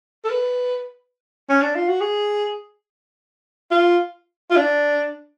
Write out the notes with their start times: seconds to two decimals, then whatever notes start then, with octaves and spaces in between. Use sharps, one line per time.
0.24 A4
0.30 B4
1.49 C#4
1.62 D4
1.75 F4
1.89 F#4
2.01 G#4
3.71 F4
4.50 F4
4.56 D4